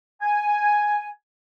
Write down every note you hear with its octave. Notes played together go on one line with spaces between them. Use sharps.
G#5